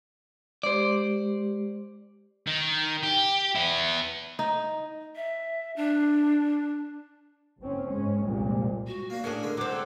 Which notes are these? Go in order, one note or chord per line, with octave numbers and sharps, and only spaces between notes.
G#3 G4 C5 D5
D#3
G4
B3 E4
D#4
E5
D4
F#1 C4 C#4
G#2 G#3 C#4
F1 C2 A#2 F3 G3 G#3
F#4
A#3 D4
A2 C#4 D4 G#4 A#4
D3 G#3
F#3 C4 D6
A4